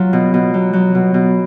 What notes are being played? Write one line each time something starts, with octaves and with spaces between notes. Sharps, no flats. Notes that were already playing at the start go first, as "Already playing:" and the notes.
Already playing: F#3 F4
B2
B2
F#3
F#3
B2
B2